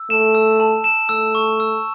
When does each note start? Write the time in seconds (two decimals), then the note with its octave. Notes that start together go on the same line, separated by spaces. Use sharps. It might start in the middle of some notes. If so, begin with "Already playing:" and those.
Already playing: E6
0.10 A3 E7
0.35 E6
0.60 A5
0.84 E7
1.09 A3 E6
1.35 C#6
1.60 E6